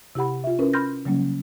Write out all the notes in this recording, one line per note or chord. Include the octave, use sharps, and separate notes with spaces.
C3 E4 G4 F#5 B5
F4 E5
C#4 E4 A#4 B4
B5 C6 F6 G6 A#6
C#3 F#3 G3 A#3 C#4